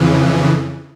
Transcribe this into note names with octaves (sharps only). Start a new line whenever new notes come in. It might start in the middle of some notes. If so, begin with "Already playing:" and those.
Already playing: F2 C#3 E3